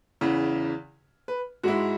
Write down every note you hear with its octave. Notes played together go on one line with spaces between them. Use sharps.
E2 C#3 E3
B4
G#2 G#3 E4 F#4